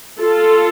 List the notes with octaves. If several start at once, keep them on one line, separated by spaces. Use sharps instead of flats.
F4 A4